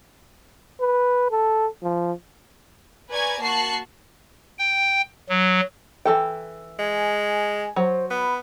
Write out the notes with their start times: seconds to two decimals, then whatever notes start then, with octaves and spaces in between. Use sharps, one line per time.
0.81 B4
1.31 A4
1.83 F3
3.10 B4 D5 G#5 A#5 C#6 G#6
3.41 A#3 F#4 A5 C#6 F#6 C7
4.59 G5
5.29 F#3
6.05 E3 A4 G5
6.79 G#3 G#5
7.76 F#3 C5
8.11 B3 B5